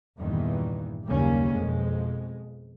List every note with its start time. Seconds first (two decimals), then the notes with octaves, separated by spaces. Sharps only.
0.19 E2 G2 A#2 D#3 E3
1.06 F#1 D#2 C#3 G3 A#3 C#4
1.55 F2 B2 G#3